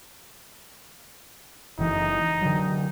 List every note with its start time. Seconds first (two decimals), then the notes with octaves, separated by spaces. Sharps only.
1.79 F#1 E3 D#4
2.42 D3 F#3